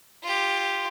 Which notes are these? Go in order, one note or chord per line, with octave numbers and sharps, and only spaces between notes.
F4 G4